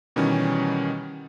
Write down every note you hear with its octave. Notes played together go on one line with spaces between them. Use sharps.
B2 D#3 E3 G3 C#4